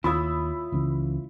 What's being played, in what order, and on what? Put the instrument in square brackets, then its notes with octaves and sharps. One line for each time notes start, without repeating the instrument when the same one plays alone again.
[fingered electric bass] D#2 [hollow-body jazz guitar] E4 F4 C#5 [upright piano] B5 D#6 E6
[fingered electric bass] C#2 C#3 E3